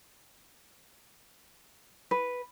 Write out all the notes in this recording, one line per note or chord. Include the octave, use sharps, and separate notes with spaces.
B4